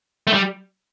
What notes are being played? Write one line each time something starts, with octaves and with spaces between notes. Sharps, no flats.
A3
G3